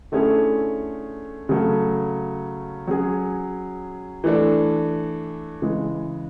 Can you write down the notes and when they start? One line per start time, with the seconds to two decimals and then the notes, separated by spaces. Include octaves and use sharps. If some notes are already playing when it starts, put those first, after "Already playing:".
0.12 D3 A3 C#4 E4 G#4
1.49 C#3 F#3 A3
2.87 F#3 C#4 G#4
4.24 E3 A3 D4
5.62 C#3 E3 G#3